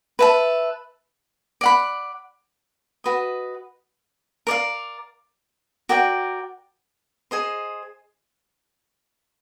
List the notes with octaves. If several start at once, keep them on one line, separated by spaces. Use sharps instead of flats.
B4 E5 A5
D5 F#5 B5
F#4 B4 D#5
A#4 D5 F5
F#4 A#4 D5 G5
G#4 C5 D#5